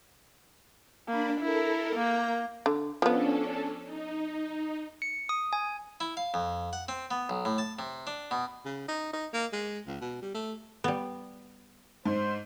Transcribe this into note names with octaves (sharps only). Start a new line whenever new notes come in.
A#3 D4 B5
E4 A4 A#4
A#3 A#5 G6
D3
F3 B3 C#4 D4 A4
D#4
C#7
D#6
G#5
E4
F5
F2
F#5
C4
B3
B1
A2
A5
C3
D4
B2
C#3
D#4
D#4
A#3
G#3
C#2
B2
G3
A3
G3 B3
G#2 C5